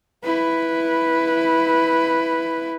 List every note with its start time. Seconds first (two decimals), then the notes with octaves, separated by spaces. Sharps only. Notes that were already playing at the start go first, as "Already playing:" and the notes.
0.24 E4 B4